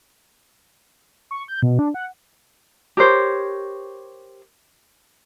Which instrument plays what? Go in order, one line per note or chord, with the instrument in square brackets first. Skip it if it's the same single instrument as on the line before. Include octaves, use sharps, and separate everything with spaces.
[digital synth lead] C#6
G6
B2
D4
F#5
[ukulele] G4 A#4 C5 C#5